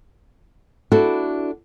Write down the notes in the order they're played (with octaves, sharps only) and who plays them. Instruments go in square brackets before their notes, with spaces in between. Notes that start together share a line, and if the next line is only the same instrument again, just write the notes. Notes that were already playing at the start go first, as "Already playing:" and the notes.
[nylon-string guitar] D4 E4 F#4 A4